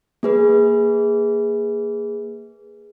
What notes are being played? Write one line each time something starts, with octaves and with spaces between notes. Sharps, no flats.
A#3 G#4 B4